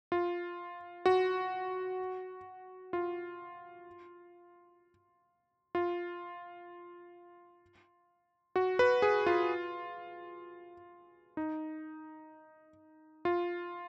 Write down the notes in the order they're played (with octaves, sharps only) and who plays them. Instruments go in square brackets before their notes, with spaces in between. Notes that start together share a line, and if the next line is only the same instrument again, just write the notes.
[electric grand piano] F4
F#4
F4
F4
F#4
B4
G#4
F4
D#4
F4